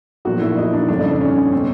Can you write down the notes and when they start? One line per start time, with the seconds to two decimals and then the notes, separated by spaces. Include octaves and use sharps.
0.25 B1 A#2 F3 F#4
0.41 E4
0.57 D#4
0.73 D4
0.89 G1 F2 C#3 D4
0.99 D#4
1.10 D4
1.21 C#4
1.52 B2 C4